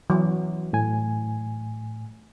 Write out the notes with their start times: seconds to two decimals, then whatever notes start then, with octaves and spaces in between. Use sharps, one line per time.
0.10 E3 F#3
0.73 A2 G#5